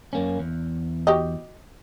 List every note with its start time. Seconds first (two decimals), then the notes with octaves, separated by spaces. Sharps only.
0.13 F#2 A#3 C#4
0.39 E2
1.07 F#4 G4 D#5